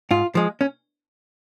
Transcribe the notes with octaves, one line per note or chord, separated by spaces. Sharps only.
G#2 F4
F3 G#3
C#4